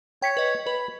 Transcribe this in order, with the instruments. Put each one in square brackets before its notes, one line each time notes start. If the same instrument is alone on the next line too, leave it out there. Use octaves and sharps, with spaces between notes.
[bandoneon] C#5 [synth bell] G5 B6 C#7
[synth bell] B4 D#5
[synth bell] B4 [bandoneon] B5